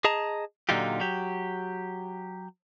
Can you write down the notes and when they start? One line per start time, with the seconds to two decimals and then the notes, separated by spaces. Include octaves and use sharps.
0.05 G#4 D#5 A5 A#5
0.69 A#2 D3 F#3 D#4 F4 G4
1.00 F#3 G4